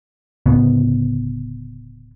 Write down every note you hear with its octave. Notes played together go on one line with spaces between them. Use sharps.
D1 C#3 B3